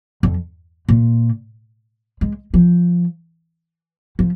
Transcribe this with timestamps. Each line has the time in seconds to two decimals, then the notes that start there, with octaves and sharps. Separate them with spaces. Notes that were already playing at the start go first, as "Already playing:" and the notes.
0.23 F2
0.89 A#2
2.21 G#3
2.54 F3
4.19 F3